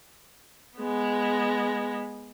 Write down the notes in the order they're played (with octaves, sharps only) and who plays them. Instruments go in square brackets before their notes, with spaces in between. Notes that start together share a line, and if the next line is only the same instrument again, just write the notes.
[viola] G#3 B3